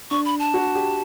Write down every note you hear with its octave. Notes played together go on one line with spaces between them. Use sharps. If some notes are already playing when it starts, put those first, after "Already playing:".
D4 C#6
B5
A5
F#4
G4